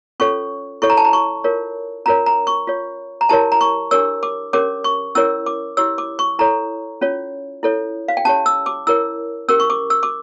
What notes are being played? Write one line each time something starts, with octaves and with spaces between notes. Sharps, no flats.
C#4 F4 A4 C#5 C#6
E4 A4 C#5 C#6
A#5
A5
A#5
C#6
F4 A#4 C#5
C#4 F4 A#4 C#5 A#5
A#5
C#6
F4 C#5
A#5
E4 G4 A#4 C#5 A5
A#5
C#6
D4 G4 A#4 C#5 E6
D6
C#4 G4 A#4 C#5 D6
C#6
C#4 E4 A#4 C#5 E6
D6
E4 G4 C#5 E6
D6
C#6
E4 A4 C#5 A#5
C#4 F4 C#5
E4 A4 C#5
F5
G5
C#4 G4 C#5 A5
E6
D6
E4 A#4 C#5 E6
C#4 G4 A#4 E6
C#6
D6
E6
D6